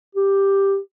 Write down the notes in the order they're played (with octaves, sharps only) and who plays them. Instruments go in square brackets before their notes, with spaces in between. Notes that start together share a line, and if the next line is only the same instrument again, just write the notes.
[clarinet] G4